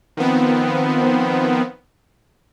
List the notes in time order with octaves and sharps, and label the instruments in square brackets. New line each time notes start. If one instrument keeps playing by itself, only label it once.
[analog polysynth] D#3 F3 B3 C4